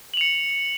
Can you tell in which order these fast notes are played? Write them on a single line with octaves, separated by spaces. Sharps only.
F#7 F7 C#7